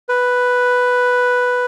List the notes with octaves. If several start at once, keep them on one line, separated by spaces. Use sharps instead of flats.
B4